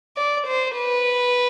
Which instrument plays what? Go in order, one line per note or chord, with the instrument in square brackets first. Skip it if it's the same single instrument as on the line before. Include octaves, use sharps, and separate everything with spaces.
[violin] D5
C5
B4